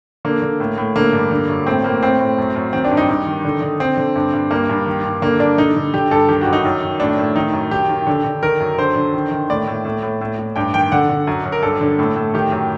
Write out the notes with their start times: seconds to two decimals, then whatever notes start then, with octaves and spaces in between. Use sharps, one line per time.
0.25 D3 A#3
0.42 D3
0.60 A2
0.78 A2
0.96 D3 A#3
1.13 G2
1.31 D3
1.49 F#2
1.66 A2 C4
1.84 A2 A#3
2.02 A2 C4
2.20 A2
2.38 F#2
2.56 F#2
2.73 D#3 C4
2.85 D4
2.91 G2
2.97 D#4
3.09 G2
3.27 D#3
3.44 D3
3.62 D3
3.80 D3 C4
3.97 D3
4.16 G2
4.33 G2
4.51 G2 A#3
4.70 G2
4.86 D#3
5.04 G2
5.22 D3 A#3
5.40 G2 D4
5.58 D3 D#4
5.76 D3
5.94 D3 G4
6.11 G2 A4
6.29 D#3 G4
6.41 F#4
6.47 F#2
6.53 D#4
6.65 F#2
6.82 D#3
7.00 A2 D4
7.18 A2
7.35 D#3 D#4
7.53 F#2
7.71 D#3 G4
7.89 D#3
8.07 D3
8.24 D3
8.42 D#3 A#4
8.60 F#2
8.78 D3 C5
8.95 D3
9.14 D#3
9.32 D#3
9.50 A2 D5
9.67 A2
9.85 A2
10.03 A2
10.21 A2
10.39 A2
10.56 G2 G5
10.74 D#3 G5
10.92 D3 F#5
11.09 D3
11.27 F#2
11.45 F#2
11.52 A#4
11.63 G2 A4
11.81 D3
11.99 A2
12.16 A2
12.34 D#3 G4
12.52 F#2